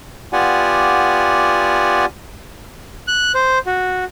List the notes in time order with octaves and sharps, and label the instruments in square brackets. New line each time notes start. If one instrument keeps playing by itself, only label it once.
[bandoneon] B3 F4 G4 D5 F#5 G#5
[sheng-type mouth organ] F#6
C5
F#4